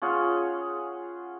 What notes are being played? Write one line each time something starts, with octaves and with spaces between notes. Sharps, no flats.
C#4 F4 G#4 F#5